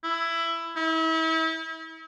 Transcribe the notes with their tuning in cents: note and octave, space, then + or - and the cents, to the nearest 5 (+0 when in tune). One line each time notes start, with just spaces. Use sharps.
E4 +15
E4 -35